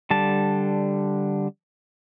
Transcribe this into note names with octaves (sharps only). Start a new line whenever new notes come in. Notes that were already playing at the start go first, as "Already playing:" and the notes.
D3 G3 A5